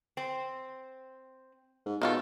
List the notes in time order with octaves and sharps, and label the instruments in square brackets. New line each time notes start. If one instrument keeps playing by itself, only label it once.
[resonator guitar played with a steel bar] C4
[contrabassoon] G#2
[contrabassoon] B2 [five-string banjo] D#3 F4 A4